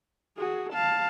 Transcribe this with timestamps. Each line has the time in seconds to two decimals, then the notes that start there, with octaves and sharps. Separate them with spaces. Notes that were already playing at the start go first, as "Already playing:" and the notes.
0.37 F#4 G#4
0.73 F5 A5